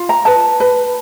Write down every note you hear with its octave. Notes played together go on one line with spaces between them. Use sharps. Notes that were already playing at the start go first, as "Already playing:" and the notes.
Already playing: F4
A#5
B4 A5
B4